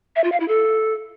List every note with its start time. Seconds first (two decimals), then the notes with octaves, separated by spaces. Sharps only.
0.16 E5
0.24 F4
0.32 F5
0.40 E4
0.48 A4